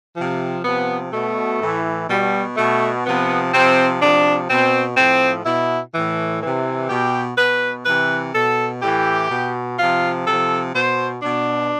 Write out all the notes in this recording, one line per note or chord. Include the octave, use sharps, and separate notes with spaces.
C3 F3
C3 F3 B3
B2 A3
A2 E3
B2 G3
B2 A3
C3 F3 B3
C3 F3 C4
C3 F3 D4
B2 C4
A2 F3 C4
B2 E4
A2 E3
C3 E3
B2 G4
B2 B4
C3 E3 B4
B2 A4
A2 E3 G4
B2
C3 F3 F4
C3 F3 A4
B2 C5
B2 D4